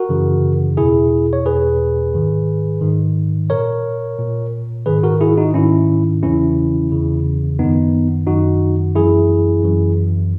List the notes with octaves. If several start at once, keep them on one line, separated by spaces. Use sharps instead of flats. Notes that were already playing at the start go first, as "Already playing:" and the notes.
Already playing: F#4 A#4
F#2 C#3 E3
E2 B2 E4 G#4
C#5
E2 B2 G#4 B4
G#2 D#3
G#2 D#3
A#2 A#4 C#5
A#2
G#2 D#3 G#4 B4
F#4 A#4
E4 G#4
D#4 F#4
G#2 D#3 C#4 E4
E2 C#3 E3 C#4 E4
E2 C#3 E3
F#2 D#3 B3 D#4
F#2 D#3 D#4 F#4
F#2 E3 E4 G#4
F#2 E3